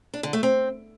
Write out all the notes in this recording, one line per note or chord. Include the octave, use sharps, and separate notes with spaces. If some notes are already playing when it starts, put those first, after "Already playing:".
D4
D3
A3
C4